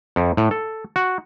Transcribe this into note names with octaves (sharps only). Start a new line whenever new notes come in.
F2
A2
A4
F#4